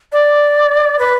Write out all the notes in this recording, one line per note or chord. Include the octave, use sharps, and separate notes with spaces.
D5
B4